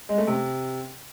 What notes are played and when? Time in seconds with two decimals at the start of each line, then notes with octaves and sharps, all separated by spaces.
0.09 G#3
0.18 A3
0.27 C3